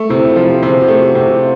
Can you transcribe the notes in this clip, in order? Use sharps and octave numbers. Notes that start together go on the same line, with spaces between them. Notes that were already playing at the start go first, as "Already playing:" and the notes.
Already playing: A3
C3 E4
F4
F3
G4
C3
G#4
F#4
A3 G4
G4
F#4
C3
F4